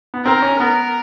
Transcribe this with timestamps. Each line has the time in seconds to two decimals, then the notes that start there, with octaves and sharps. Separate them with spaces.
0.14 B3
0.25 C4 A#4
0.42 C#4
0.60 B3 A#4